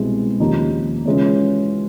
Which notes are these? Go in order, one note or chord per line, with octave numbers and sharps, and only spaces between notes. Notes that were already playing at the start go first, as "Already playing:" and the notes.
Already playing: C2 B2 G#3 C4 E4
D#2 C#3 F3 A#3 D#4
C#3 E3 G#3 C#4 F4